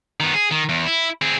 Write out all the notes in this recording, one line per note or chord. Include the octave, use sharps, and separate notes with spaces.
D#3 B3
G#4
D#3
E2
E4
C4 G#4